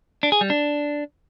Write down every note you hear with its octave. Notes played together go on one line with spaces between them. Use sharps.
D4
G#4
G3
D4